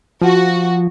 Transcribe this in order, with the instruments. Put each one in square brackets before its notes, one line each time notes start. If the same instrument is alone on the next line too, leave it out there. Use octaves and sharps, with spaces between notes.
[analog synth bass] F3 [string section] F#4